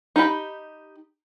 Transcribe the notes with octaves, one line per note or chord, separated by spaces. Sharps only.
D#4 G4 A5 B5